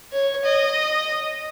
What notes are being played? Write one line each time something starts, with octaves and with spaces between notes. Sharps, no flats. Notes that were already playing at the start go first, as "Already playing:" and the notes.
C#5
D#5